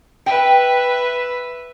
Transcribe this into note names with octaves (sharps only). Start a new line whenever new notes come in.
B4 E5 G5